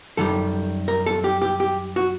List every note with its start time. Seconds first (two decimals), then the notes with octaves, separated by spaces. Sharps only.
0.17 F#2 D#3 G3 A4
0.88 A#4
1.06 A4
1.24 G4
1.42 G4
1.60 G4
1.96 F#4